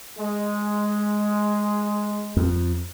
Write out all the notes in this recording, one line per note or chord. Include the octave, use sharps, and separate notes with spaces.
G#3
F2